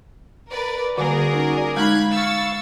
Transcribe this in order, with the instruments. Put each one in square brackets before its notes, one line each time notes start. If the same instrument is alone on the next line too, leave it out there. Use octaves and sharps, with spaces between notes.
[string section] A#4 B4 D5
[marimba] D3 G3 A#3 [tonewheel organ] F#4 D5 [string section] G#4 A#4
[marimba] C#4 D#4
[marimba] G#3 D#4 [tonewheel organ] F5 [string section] B5 F#6 G#6
[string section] C#6 E6 A6